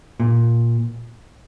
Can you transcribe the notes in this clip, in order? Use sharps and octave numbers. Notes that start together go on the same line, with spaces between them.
A#2